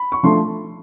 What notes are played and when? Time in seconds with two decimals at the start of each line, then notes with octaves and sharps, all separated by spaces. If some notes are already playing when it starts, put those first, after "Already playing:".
Already playing: B5
0.12 C#6
0.23 F3 A3 D4 C6